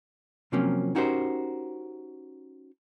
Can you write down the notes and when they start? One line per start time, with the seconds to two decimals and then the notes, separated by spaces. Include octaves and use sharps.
0.52 C3 F3 F#3 A#3 C4 C#4
0.95 C#4 D#4 F#4 G4 A#4 C5